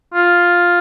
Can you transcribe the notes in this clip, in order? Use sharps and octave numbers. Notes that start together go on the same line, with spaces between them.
F4